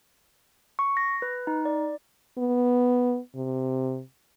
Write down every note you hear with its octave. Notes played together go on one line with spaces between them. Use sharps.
C#6
A#6
B4
D#4
D5
B3
C3